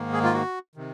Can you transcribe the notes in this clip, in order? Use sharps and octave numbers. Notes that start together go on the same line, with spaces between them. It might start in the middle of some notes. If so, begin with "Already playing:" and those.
Already playing: G#2 D#3 A#3
G#4
F4
F#4
C3 D#3